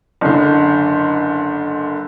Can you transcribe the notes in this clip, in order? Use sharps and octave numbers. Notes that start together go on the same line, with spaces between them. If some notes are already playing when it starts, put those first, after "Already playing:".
F#1 D3